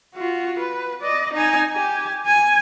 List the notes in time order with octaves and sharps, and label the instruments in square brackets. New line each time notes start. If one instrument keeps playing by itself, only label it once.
[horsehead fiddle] F4 F#4
B4
D5 D#5
D#4 G#5
G4 G#5
G#5